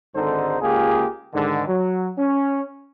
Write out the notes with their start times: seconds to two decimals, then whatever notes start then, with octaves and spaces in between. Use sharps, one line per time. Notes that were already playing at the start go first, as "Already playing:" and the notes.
0.15 G#1 G#2 D3 D#4 A4 C5
0.62 C#2 A#3 F4 G4 G#4
1.34 G#2 D3 D#3
1.68 F#3
2.18 C#4